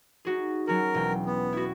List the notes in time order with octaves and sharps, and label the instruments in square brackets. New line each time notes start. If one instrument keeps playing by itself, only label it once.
[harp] D#4 F#4 G#4
[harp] F#3 C#4 F#4 [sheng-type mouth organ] A#4
[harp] E1 G5
[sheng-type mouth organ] B3
[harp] E4 F#4